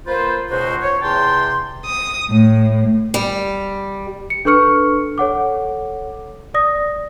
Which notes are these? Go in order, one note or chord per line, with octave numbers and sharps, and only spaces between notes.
A#3 F4 B4 C5
C#2 B2 D#4 F#4 C5
C#5
E2 C3 G5 A5 C6
D#6
A2
G3
C#7
D4 A4 B4 C#6 F6 C#7
A4 C#5 F#5 D6
D5 D#6 A#6